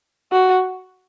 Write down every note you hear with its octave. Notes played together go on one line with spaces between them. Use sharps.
F#4